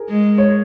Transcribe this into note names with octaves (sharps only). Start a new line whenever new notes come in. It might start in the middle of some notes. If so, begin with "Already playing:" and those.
Already playing: G#4 A#4
G#3
C#5